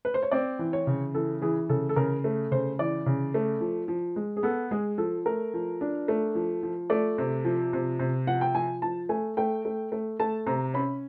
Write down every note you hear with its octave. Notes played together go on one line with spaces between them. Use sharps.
B4
C5
C#5
C4 D5
E3
C#5
C#3
E3 A4
E3 G#4
C#3 A4
A4
C#3 A#4
A3
C#3 C5
E3 D5
C#3
A3
F3
F3
G#3
G#4
B3 A4
G#3 G#4
F3 A4
A3 A#4
F3
D4
A3
F3
F3
A3 D5
C3
F3
C3
C3
F3 F#5
G5
F3 G#5
F3 A5
A3 G#5
A3 G5
A3
A3
A3 A5
C3 A#5
C#4 B5